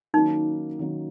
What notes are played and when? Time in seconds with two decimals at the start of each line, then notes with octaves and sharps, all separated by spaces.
0.14 D#3 F#3 A#3 C#4 D#4
0.79 D#3 F#3 A#3 C#4